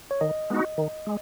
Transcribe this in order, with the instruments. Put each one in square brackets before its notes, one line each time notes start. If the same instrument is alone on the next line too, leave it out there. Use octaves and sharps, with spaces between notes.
[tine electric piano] C#5
[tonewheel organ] D#3 [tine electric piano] D#5
[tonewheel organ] G#3 B3 D#4 F#4
D#3
G#3